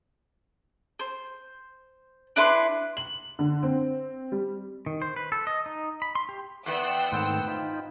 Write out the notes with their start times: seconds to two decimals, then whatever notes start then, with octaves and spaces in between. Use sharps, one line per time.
0.99 C5
2.36 D4 E4 B4 C6
2.97 F#7
3.39 D3
3.63 C4
4.32 G3
4.86 D#3
5.02 C5
5.16 B4
5.32 A4
5.47 D#5
5.66 D#4
6.02 B5
6.15 C6
6.29 G4
6.66 E2 B3 D5 F#5 G5 C6 E6 F#6
7.12 G#2 D#3 A3 C4 B4 C5
7.47 D#4 F4 G5 B5